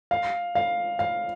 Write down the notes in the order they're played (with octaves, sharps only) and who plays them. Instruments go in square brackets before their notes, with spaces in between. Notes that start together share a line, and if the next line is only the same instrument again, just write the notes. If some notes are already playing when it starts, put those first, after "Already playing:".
[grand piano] F5
F5
F5